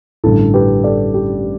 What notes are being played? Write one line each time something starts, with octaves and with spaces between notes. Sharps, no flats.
A1 G2 D3 E4 A4
G4 B4
A4 D5
G4